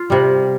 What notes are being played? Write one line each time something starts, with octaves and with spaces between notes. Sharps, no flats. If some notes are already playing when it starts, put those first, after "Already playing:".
Already playing: F4
C3 G3